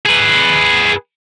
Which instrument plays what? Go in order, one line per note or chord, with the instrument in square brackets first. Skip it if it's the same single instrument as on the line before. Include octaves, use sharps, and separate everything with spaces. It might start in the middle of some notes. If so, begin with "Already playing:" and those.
[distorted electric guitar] G#4 B4